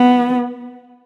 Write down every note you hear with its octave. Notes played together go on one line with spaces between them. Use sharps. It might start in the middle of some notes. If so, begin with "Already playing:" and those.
Already playing: B3